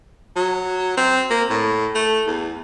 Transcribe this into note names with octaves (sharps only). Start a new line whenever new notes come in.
F#3
C4
A#3
A2
A3
E2